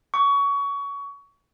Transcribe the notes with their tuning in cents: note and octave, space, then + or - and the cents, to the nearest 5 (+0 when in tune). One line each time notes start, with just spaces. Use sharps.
C#6 +25